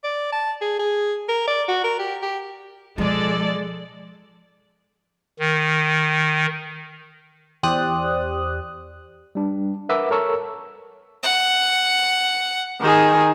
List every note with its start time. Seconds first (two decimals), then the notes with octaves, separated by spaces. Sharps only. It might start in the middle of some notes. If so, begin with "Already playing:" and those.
0.04 D5
0.32 A5
0.61 G#4
0.79 G#4
1.29 A#4
1.48 D5
1.68 F#4
1.84 A#4
1.99 G4
2.23 G4
2.98 B2 F3 G#3 A4 D5
5.39 D#3
7.63 E2 G4 C5 D5 D#6 F#6
9.35 G3 D4
9.89 A#4 B4 E5 F#5 D6 E6
10.11 A4 A#4 C#5 A5 C#6 E6
11.23 F#5
12.81 D#3 G#4